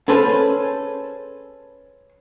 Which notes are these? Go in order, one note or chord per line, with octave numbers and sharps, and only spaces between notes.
C#4 G#4 A4 B4 C5